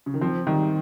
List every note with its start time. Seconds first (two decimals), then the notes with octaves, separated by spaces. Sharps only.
0.06 C#3
0.14 D#3
0.21 F3 C4
0.47 D#3 G3